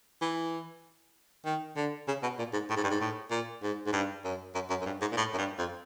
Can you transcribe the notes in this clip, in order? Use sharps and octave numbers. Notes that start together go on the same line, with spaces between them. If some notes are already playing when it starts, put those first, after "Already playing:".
E3
D#3
D3
C#3
B2
A#2
G#2
A2
G#2
G2
G#2
A2
A#2
G#2
G#2
G2
F#2
F#2
F#2
F#2
G2
G#2
A#2
A2
F#2
G2
F2